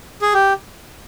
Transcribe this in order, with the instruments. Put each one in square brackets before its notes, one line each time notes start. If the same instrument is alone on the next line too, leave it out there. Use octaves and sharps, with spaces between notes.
[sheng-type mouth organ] G#4
G4